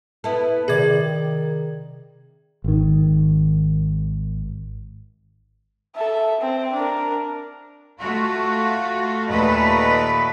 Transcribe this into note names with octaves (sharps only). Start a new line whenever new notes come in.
B3 E4 A4
C3 D#3 G#4 D5 G#6
G#1 D#3
A4 E5
C4
D4 A#4
A3 F4 F#4
D#2 A#2 A3 B4 D#5